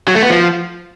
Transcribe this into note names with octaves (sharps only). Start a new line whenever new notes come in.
F#3
A3
B3
F3